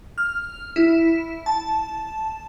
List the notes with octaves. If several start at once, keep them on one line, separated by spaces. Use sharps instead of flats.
F6
E4
A5